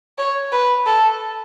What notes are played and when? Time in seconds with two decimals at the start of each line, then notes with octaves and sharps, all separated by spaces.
0.18 C#5
0.52 B4
0.86 A4